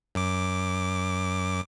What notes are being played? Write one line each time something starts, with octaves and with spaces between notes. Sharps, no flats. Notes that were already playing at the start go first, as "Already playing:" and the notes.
F#2 D6